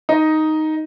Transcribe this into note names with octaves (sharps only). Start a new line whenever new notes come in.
D#4 D#5